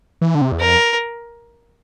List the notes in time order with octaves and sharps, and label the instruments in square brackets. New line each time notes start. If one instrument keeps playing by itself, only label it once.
[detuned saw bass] E3
D3
C3
E2
[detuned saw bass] F2 [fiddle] A#4